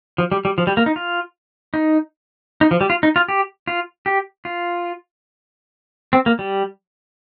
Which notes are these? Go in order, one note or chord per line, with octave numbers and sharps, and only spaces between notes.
F3
G3
G3
F3
G3
A#3
D#4
F4
D#4
D#4
F3
G3
F4
D#4
F4
G4
F4
G4
F4
C4
A#3
G3